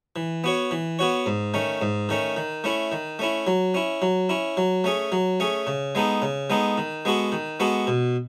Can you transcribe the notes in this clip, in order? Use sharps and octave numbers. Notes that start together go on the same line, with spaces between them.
E3
B3 F#4 C#5
E3
B3 F#4 C#5
G#2
D#3 A3 C#4
G#2
D#3 A3 C#4
D#3
A3 C#4 E4
D#3
A3 C#4 E4
F#3
C#4 E4
F#3
C#4 E4
F#3
A3 C#4 G#4
F#3
A3 C#4 G#4
C#3
G#3 B3 D#4 A4
C#3
G#3 B3 D#4 A4
D#3
G#3 B3 F#4 A4
D#3
G#3 B3 F#4 A4
B2